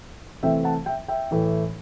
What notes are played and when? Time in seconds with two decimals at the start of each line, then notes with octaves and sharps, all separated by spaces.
0.43 C3 E3 A3 C4 E5 G5
0.64 F#5 A5
0.86 E5 G5
1.08 E5 G5
1.31 A2 E3 A3